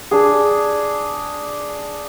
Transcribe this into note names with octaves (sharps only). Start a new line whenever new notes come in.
D4 G#4